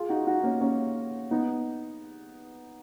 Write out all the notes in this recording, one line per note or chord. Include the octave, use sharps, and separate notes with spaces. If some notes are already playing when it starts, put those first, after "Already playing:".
Already playing: F4 G#4
D#4 F#4
D#4 F#4
A#3 C#4
A#3 C#4
B3 D#4